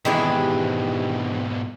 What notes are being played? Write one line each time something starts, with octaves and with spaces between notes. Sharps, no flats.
G#2 B2 D#3 E3 C4 D4 G4 G#4